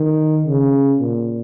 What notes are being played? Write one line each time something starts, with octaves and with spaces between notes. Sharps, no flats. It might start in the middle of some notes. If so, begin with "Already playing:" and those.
Already playing: D#3
C#3
A#2